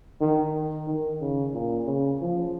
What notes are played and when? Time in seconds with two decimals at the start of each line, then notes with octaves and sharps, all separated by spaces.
0.20 D#3
0.87 D#3
1.20 C#3
1.53 A#2
1.87 C#3
2.20 F3